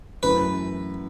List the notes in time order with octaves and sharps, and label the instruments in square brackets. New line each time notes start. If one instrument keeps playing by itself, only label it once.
[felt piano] F#2 E3 A3 E4 [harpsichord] B4